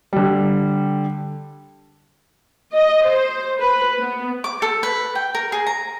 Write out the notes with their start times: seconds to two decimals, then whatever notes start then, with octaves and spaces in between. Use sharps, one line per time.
0.13 D3 G3
2.72 D#5
3.05 C5
3.60 B4
4.00 B3
4.44 D6
4.62 A4
4.83 B4
5.15 G5
5.35 A#4
5.52 G#4
5.67 A#5